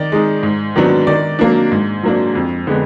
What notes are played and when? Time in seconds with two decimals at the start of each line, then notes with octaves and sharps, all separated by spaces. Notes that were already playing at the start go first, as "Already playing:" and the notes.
Already playing: D#3 D5
0.12 G#3 D#4
0.43 G#2
0.76 D#3 F#3 B3 D4
1.07 D#3 D5
1.39 F#3 A#3 D4
1.72 G#2
2.03 F#3 A#3 D4
2.35 F2
2.67 D3 G#3 B3